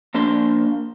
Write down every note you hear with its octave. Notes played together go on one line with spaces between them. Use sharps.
F3 A#3 D4 C6